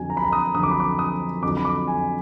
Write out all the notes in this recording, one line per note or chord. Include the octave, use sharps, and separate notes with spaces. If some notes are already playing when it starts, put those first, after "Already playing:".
Already playing: F2 D3 F#3 G#5
A#5
B5
A#5
D#6
F2 D3 F#3 D#6
D6
B5
D6
D#6
F2 D3 F#3 D6
B5
D6
G#5